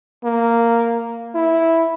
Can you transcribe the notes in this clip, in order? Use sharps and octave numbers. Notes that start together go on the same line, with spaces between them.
A#3
E4